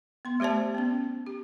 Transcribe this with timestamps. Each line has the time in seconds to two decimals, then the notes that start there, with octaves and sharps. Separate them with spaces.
0.25 B3 C6
0.40 A3 G4 C5 D5 A5
0.75 B3 C#4
1.27 G4